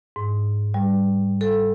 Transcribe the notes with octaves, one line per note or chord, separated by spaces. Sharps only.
G#2
G3
A4